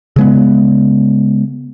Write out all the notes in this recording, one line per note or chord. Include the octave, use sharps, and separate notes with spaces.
C#3 G#3 B3